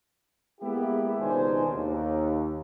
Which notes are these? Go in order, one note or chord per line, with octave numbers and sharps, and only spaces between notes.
G#3 A#3 B3 E4 G4
C#2 B2 D#3 D4 C5 G#5
D#2